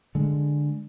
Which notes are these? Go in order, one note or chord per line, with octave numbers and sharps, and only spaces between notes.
D3 G#3